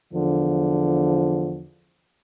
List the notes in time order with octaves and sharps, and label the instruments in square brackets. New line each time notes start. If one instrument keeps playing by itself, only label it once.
[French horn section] E2 D3 F3